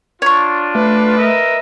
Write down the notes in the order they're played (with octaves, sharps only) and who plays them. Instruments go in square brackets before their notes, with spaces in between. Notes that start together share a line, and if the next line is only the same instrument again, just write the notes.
[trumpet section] D4 F4 [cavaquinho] C#5 C#6
[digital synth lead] A3 [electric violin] B4
[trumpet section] A#4 D#5 E5